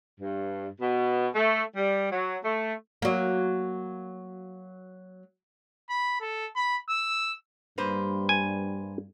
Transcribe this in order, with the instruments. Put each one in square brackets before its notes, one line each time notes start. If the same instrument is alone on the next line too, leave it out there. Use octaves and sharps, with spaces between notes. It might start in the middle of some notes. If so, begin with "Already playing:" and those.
[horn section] G2
B2
A3
G3
F#3
A3
[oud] F#3 A#3
[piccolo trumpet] B5
A4
B5
E6
[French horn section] G2 [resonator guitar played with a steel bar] A#3 B4 C5
[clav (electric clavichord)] G#5